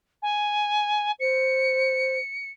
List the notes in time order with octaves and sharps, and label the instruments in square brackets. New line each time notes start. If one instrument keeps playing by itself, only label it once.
[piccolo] G#5
[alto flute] C5 [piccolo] C#7